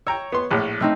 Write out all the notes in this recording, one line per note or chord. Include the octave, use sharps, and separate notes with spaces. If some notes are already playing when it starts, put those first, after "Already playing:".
C#5 G5 A#5 E6
B3 C6
A#1 A2
A3 C4 D#4